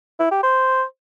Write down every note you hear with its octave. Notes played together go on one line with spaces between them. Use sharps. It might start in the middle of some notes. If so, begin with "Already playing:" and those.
E4
G4
C5